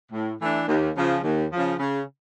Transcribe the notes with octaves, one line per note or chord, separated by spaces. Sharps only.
A2
E3 A3 D4
D#2
C#3 F3
D#2
C#3 F3
C#3